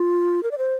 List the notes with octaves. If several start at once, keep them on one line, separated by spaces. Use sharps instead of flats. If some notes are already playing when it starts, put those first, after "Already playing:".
Already playing: F4
A#4
D5
C5